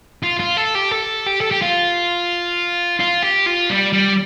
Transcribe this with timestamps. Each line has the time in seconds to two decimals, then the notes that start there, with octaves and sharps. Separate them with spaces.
0.23 F4
0.39 F4
0.57 A4
0.75 G4
0.91 A4
1.27 G4
1.41 A4
1.51 G4
1.61 F4
3.00 F4
3.23 G4
3.47 F4
3.70 G3
3.93 G3